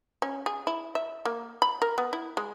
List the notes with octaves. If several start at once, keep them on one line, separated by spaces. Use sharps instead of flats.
C#4
G#4
E4
E5
A#3
B5
A#4
B3
E4
G#3